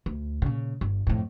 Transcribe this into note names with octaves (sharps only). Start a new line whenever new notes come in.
D2
A#2 C#3
G1
F2 A2